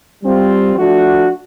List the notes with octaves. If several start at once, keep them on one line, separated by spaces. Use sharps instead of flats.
G3 C4 F4
F3 A3 D4 F#4